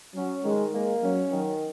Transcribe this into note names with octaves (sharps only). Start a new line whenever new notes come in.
F#3 C#4
D#3 G#3
G#3 A#3
F#3 C#4
D#3 F#3